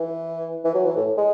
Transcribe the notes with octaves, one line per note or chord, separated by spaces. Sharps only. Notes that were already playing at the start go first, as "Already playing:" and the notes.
Already playing: E3
E3
F#3
E3
A2
G#3